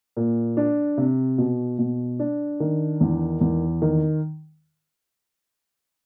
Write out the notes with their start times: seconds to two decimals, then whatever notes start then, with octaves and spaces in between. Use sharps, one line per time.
0.17 A#2
0.57 D4
0.97 C3
1.38 B2
1.79 B2
2.19 D4
2.60 D#3
3.01 E2
3.41 E2
3.82 D#3